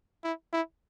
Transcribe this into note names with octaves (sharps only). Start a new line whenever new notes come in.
E4
E4